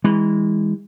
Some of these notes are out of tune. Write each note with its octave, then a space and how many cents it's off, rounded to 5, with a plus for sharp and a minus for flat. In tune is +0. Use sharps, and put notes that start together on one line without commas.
E3 -25 G#3 -25